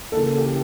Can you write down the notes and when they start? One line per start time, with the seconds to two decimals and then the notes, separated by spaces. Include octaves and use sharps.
0.12 C#3 E3 A#3 A4
0.37 G4